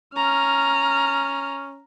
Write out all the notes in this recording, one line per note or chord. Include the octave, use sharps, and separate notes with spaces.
C#4 A#5 F6